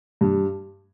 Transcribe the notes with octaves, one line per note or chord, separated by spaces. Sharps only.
G2